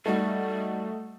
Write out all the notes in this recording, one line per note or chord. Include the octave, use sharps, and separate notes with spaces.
G3 A3 D#4 F#4